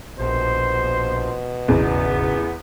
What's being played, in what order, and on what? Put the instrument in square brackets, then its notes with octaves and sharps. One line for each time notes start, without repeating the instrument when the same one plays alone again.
[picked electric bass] A#1 [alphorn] B2 [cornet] C5
[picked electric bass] D#1 G#1 C#3 [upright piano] E2 [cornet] B3